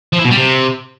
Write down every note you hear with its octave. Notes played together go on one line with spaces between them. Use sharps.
F3
E4
B2
G3
C3